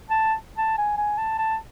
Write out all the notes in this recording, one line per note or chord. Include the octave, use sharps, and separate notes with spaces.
A5
A5
G#5
G#5
A5
A5